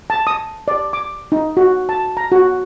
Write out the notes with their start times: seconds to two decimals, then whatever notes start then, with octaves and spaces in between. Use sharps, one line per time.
0.10 A5
0.27 D#6
0.68 D5
0.93 D6
1.32 D#4
1.57 F#4
1.89 A5
2.17 A#5
2.32 F#4